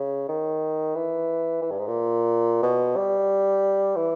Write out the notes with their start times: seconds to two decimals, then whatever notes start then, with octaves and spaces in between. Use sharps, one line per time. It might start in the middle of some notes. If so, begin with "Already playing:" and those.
Already playing: C#3
0.28 D#3
0.95 E3
1.62 E3
1.71 G2
1.79 G#2
1.87 A#2
2.63 B2
2.96 G3
3.96 E3